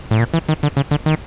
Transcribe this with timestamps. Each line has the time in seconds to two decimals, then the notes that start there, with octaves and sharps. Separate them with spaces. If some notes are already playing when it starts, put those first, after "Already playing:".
0.11 A2
0.19 A#2
0.34 E3
0.49 D#3
0.63 D3
0.77 C#3
0.91 D3
1.06 D#3